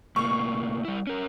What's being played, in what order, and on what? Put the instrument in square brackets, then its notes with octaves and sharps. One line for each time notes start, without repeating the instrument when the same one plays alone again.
[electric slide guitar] A2 C3 A#3 [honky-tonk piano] C#6
[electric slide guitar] G3 E4
C#4 A#4